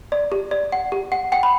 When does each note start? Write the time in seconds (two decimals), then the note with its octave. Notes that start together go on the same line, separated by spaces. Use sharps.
0.12 D5
0.32 G4
0.51 D5
0.72 F#5
0.92 G4
1.12 F#5
1.32 F#5 G5
1.43 B5